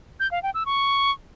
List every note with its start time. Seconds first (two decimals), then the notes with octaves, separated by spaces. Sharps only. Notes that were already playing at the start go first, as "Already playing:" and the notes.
0.20 G6
0.31 F5
0.43 G5
0.54 E6
0.66 C#6